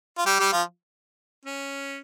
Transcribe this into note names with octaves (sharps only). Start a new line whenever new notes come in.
F4
G3 G4
G3 G4
F3 F4
C#4